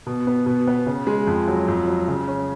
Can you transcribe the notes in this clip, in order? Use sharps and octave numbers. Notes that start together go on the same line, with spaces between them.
B2
B3
B2
B3
C#3
G#3
F2
F#3
F2
F#3
C#3
C#4